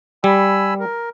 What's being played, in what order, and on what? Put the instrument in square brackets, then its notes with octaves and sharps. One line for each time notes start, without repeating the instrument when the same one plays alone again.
[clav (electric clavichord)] G3 [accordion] G#5 B5 E6
[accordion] A#4